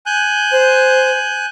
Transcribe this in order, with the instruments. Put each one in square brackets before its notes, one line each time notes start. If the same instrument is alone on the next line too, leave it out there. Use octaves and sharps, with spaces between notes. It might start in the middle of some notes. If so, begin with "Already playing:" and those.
[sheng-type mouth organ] G#5 F#6 G6
[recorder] C5